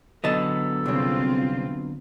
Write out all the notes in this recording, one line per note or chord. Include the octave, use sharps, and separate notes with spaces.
D3 F#3 B3 A4 D#5 A5
C2 C#3 C4 F4